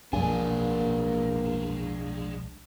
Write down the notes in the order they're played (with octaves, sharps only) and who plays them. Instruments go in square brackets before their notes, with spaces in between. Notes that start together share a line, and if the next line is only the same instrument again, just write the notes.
[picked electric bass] B1 F3 [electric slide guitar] G#3 D4 [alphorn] A#3 [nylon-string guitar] G#5